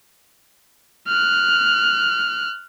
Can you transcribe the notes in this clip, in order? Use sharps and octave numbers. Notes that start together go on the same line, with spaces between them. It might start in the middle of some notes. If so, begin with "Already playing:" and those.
F6 F#6